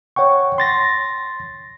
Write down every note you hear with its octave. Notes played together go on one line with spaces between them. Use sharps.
C#5 F#5 G5 C#6
C6 A6 A#6